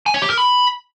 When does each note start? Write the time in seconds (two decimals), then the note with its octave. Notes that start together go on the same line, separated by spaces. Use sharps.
0.06 G#5
0.14 C#5
0.22 G4
0.30 A#4
0.38 B5